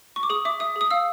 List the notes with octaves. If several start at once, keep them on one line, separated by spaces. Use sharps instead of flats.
C#6
D6
G#4 D#6
E5 D6
E5 D#6
G#4
D#6
F5 E6